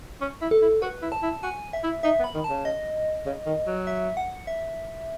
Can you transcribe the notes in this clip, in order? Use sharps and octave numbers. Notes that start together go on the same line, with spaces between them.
C#4
E4
A4
E4
F#4 B4
E4
A5
E4
F#4 G#5
E5
E4
D#4 E5
B3
B5
D#3
A5
C#3
D#5
C#3
D#3
F#3
E5
F#5
E5